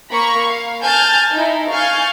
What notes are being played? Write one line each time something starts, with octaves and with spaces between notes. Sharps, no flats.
A#3 A#5 B5 C#6
F5
G#5 A5 F6 G6 A6
D#4 E4
F5 G#5 C#6 F6 G6 A6